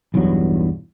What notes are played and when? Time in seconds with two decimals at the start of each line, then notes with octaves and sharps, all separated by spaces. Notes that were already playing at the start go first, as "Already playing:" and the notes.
0.14 B1 E2 G2 F#3